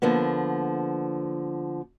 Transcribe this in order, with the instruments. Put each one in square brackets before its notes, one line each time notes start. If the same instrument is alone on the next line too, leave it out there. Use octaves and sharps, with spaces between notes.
[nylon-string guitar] D3 F3 A#3 B3